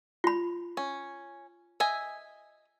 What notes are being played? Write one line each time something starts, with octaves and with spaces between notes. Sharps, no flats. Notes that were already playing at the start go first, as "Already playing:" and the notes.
F4 B5
C#4
D#5 E5 G#5